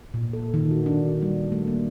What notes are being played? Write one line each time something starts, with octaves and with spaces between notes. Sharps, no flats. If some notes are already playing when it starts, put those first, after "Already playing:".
A#2
A4
D#3
F#4
D4
G3
A3
A#3